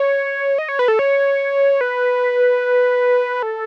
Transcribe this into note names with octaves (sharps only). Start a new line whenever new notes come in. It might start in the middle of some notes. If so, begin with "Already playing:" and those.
Already playing: C#5
D#5
C#5
B4
A4
C#5
B4
A4